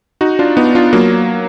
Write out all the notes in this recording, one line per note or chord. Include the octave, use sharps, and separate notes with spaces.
D#4 F#4
D4 F4
B3 D#4
D4 F4
F#3 A#3